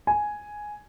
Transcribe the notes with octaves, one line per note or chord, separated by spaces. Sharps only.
G#5